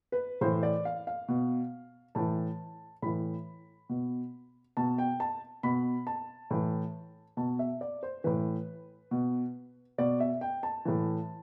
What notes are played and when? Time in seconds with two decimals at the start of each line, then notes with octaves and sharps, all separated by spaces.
0.12 B4
0.41 A2 E3 C5
0.63 D5
0.85 F5
1.07 F5
1.28 B2
2.15 A2 E3 A5
3.02 A2 E3 B5
3.89 B2
4.77 B2 A5
4.98 G5
5.20 A5
5.63 B2 B5
6.07 A5
6.51 A2 E3
7.37 B2 A5
7.59 E5
7.81 D5
8.03 C5
8.24 A2 E3 B4
9.11 B2
9.98 B2 D5
10.20 E5
10.41 G5
10.63 A5
10.85 A2 E3